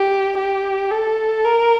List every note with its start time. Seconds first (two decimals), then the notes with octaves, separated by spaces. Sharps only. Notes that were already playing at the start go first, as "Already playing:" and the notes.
Already playing: G4
0.37 G4
0.91 A4
1.45 A#4